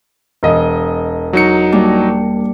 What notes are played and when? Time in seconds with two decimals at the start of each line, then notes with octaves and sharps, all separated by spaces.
0.43 E1 D#5
1.33 F#3 D#4 C#7
1.72 G3 A#3 D4